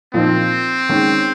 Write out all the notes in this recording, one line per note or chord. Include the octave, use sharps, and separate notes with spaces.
A#2 F3 A#3 C4 D#4
D#3 G#3 C#4